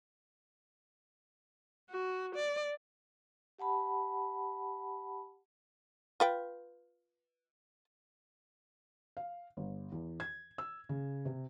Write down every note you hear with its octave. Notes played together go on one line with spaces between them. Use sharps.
F#4
D5
G4 F#5 A5 B5
F4 B4 G5
F5
G1
E2
G#6
E6
C#3
C3